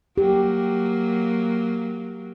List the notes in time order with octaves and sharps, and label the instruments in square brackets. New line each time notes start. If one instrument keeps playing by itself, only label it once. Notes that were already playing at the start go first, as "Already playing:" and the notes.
[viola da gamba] F#3 A#3 [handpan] G4